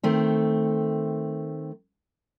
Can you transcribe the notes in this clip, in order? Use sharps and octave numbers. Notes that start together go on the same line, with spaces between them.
D#3 A3 C4